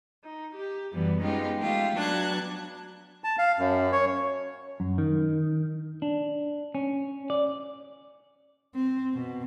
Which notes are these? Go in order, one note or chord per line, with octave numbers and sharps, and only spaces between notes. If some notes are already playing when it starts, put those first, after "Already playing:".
D#4
G4
F#2 E3 G3 B3
G#3 B3 C#4 D#4 F4 G4
A3 F4 G4
F#3 B3 D4 F#6 G#6
A5
F5
F#2
C#5
F#2
D#3
D4
C#4
D5
C4
B2